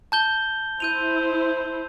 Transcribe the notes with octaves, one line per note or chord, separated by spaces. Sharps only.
A5 G6 G7
E4 C5 G6 D#7 F7